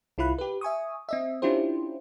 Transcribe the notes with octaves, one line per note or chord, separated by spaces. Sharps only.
C2 E4 F4 B5 F#6
G4 B4
E5 G#5 C#6 D#6
C4 D#5 E5
C#4 D4 E4 F4 G4 C5